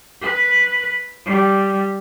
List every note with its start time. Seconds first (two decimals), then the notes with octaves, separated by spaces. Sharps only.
0.22 B4
1.26 G3